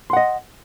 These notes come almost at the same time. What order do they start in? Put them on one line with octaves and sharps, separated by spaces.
C6 F#5 D#5